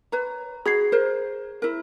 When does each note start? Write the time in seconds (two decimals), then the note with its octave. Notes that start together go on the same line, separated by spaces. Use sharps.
0.12 B4 C#5 A#5
0.66 F#4 G#4 B5 G#6 C7
0.92 A#4 C5
1.62 E4 A#4